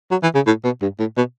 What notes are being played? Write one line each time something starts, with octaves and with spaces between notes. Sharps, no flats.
F#3
E3
C#3
A2
B2
G2
A2
B2